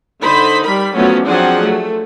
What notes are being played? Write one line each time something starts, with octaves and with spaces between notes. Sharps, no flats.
D3 D#4 C5 B5
G3 A#4 B5
F3 F#3 A3 B3 C#4 F#4
F3 F#3 C4 D4 G#4 F#5
A3